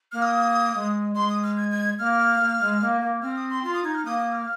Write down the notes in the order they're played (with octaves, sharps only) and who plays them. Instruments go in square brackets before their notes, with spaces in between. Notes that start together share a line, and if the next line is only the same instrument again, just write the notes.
[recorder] A#3 [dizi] F6
[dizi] D#6
[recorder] G#3
[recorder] G#3 [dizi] C6
[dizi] D#6
F6
G#6
G#6
[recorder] A#3 [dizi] F6
[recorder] A#3
G#3
A#3
A#3
[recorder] C4 [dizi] F6
[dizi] D#6
C6
[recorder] F4 [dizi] C6
[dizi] D#6
[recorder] D#4 [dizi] G#6
[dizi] F6
[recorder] A#3 [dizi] D#6
[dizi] D#6
F6